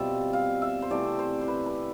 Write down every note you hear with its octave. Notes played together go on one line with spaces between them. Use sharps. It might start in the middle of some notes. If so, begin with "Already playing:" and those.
Already playing: B2 G3 C4 F4 E5
F5
E5
C5
C3 E3 A3 D5
C5
C5
B4
B4